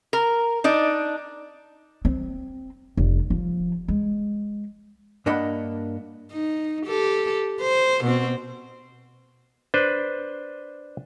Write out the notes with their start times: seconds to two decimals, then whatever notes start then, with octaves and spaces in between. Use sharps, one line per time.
0.13 A#4
0.64 D4 D#4 D5
2.05 C4
2.97 F1
3.30 F3
3.88 G#3
5.26 G2 A#3 D4 D#5 F#5 B5
6.32 D#4
6.86 G4 A4
7.61 C5
8.04 B2 C4
9.74 D4 B4 C5